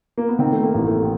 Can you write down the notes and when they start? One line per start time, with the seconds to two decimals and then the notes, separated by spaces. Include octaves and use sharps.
0.18 A#3
0.28 B3
0.39 D#3 C4
0.52 A3
0.63 A#3
0.74 A1
0.86 A3